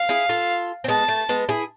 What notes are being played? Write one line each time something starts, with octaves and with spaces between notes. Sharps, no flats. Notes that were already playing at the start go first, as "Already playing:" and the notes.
Already playing: F5
E4 G#4
F4 A4
C4
G#3 B3 A5
A3
G#3 B3
E4 G#4